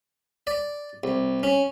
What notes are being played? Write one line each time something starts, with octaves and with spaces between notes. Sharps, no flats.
D5
C2
C#4